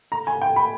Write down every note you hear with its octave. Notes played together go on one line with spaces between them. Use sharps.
A#5
G#5
G5
B5